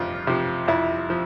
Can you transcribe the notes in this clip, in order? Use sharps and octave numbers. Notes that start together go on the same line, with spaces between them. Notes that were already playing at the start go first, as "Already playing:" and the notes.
Already playing: F2 C3 F3 F4
C3 F3
F2 E4
F3